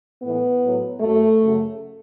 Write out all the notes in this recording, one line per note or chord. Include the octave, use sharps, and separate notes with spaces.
A2 E3 B3
A2 F#3
F#2 F#3 A3
F#2 C#3 F#3